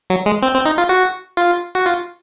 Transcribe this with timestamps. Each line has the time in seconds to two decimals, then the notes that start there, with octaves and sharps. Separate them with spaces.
0.10 F#3
0.26 G#3
0.42 C4
0.54 C4
0.65 D#4
0.78 F4
0.89 F#4
1.37 F4
1.75 F#4
1.86 F4